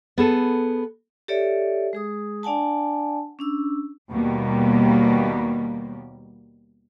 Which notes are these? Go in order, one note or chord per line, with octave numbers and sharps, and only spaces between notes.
B3 G#4 A4
G4 A4 C#5 D5 E5
G#3 G#4 D#6
D4 D5 F#5 G#5 A5
C#4 D4 E6
D#2 B2 G3 A#3